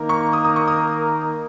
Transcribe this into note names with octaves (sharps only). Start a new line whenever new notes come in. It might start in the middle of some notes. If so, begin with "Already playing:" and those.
Already playing: D#3 A#3 D#4 A#4
C#6
D#6
D#6
C#6
D#6